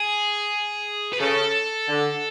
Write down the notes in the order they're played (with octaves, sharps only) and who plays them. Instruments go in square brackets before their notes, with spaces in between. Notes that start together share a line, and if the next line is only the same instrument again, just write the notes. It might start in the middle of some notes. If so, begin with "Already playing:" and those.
Already playing: [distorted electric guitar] G#4
B4
[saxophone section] C#3 [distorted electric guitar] A4
[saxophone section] D3